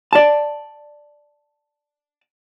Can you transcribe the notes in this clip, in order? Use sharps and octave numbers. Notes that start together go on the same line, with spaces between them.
D5 A5